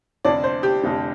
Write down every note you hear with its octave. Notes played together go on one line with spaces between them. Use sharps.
F1 F2 D3 D5
C5
G4
F1 F2 D3